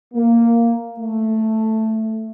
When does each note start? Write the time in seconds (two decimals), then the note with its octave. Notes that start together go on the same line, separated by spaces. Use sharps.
0.14 A#3
0.99 A3